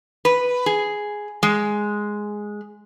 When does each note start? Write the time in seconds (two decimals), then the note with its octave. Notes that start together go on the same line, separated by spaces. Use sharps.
0.25 B4
0.66 G#4
1.43 G#3